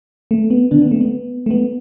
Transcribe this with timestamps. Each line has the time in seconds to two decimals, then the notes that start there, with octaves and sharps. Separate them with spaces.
0.31 A3
0.50 B3
0.71 D3 D4
0.82 B3
0.91 A3
1.01 B3
1.46 A3
1.51 B3